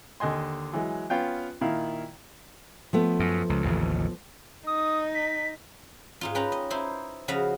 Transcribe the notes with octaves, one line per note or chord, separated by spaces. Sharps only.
D#2 D3 D#5 G#5 C6
E3 F#3 G#3
B3 C#4 F4 F5 G5
A#2 D#3 E4 F5
F3 A3 B3
F#2
C#2
A1 D#2 C#3
D#4 D#6
B6
G#2 D#4 F4
C#4 B4 G5 A#5 B5
D#5
D#4 E4 C5
C#3 F3 F#4 D#5 F5 B5